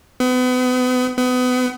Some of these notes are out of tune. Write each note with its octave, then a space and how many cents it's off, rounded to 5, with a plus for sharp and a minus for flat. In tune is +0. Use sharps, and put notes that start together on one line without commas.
B3 +35
B3 +30